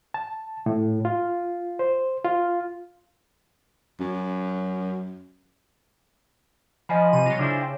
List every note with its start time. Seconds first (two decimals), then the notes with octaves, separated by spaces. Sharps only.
0.14 A5
0.66 A2
1.05 F4
1.79 C5
2.24 F4
4.00 F#2
6.89 F3 D#5 G#5 B5
7.13 C3 D#7
7.26 F#3 F4 A#6
7.39 C#3 D4 E4 C5
7.62 G5